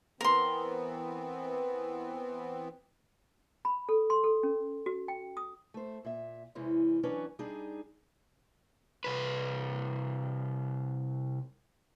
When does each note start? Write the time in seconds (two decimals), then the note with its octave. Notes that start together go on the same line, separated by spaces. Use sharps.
0.21 E3 B3 C4 A#4 C6
3.65 B5
3.89 A4
4.10 C6
4.24 A4
4.43 C#4
4.86 F#4
5.08 G5
5.37 D#6
5.74 A3 C5
6.05 A#2 E5
6.55 E2 C3 E3 G#3 C#4
7.03 E3 F#3 C#4 D4 B4 C#5
7.39 G3 D4 D#4 G#4
9.04 C2 B4